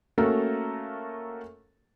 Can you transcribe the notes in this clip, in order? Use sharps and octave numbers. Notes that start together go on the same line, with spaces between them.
A3 A#3 C#4 F#4 A4 A#4